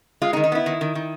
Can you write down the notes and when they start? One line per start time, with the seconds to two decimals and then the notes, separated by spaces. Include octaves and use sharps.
0.22 G#3 F4
0.33 D#4
0.37 D#3
0.44 D#4
0.52 B3 E4
0.66 D#3
0.81 D#3
0.95 D#3